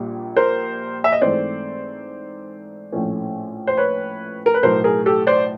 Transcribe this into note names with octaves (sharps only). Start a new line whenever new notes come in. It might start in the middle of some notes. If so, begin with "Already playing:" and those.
Already playing: A#1 A#2 G3
A#4 C5
E5
D#5
G#2 E3 A3 C4 C5 D5
A#1 A2 F3 A3 C#4
C5
B4 C#5
A#4
B4
B1 A2 F#3 A#4 C5
G#4 A#4
G4 A4
C5 D5